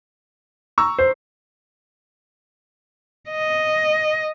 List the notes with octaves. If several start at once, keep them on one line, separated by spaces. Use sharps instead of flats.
A#5 C#6 E6
C5
D#5